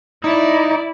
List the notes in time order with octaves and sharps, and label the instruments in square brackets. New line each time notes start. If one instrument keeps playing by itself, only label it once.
[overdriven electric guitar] D#4 [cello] E4 D5